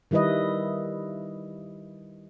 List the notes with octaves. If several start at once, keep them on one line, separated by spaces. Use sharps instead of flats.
D#3 G3 E4 B4 D#5